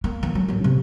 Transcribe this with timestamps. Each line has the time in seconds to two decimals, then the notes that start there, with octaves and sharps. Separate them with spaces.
0.04 A#3
0.23 E3
0.35 F#3
0.48 A1 F#3
0.64 C3